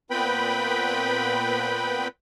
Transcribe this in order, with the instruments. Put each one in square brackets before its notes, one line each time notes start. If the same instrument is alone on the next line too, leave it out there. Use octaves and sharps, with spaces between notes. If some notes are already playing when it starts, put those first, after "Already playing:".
[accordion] A#2 B3 C4 B4 G5 B5